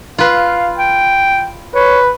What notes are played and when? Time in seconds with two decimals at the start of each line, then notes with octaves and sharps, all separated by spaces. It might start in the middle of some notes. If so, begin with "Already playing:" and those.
0.18 F4 B4 F5
0.77 G5
1.75 B4 C#5